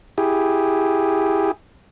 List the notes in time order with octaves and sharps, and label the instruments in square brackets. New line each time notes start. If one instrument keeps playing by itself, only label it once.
[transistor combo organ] E4 G4 G#4